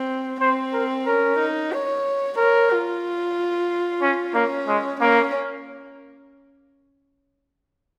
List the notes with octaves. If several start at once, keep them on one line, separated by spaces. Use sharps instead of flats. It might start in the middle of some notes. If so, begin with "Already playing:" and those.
Already playing: C4
C4 C5
A#4
C#4 A#4
D#4
C#5
A#4 C#5
F4
C#4
A#3 C#4
G#3
A#3 C#4